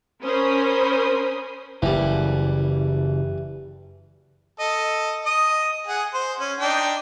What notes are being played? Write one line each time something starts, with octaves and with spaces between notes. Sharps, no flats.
C#4 A#4 C5 B5 D#6
F#1 E3 G3
A4 D#5
D#5 D#6
G#4 F#5
C5
C#4
D4 D#4 G5